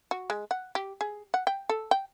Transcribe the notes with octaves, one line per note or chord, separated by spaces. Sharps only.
F#4
G#3
F#5
G4
G#4
F#5
G5
A4
G5